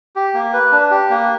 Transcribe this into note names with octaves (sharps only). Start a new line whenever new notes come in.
G4
A#3
B4
D4
G4
A#3